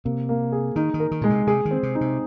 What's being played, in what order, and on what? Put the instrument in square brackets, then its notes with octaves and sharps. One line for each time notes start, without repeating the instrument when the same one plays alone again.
[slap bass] C3 [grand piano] A#3
[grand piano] A#3
G#4
[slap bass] D#3 [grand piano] D#4
[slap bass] D#3
[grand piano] A#4
[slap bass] D#3
[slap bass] A#2 [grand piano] G#3
[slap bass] C3
[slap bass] C3 [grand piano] G#4
[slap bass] D#3
[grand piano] C4
[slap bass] C3
[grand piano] D#4
[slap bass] C3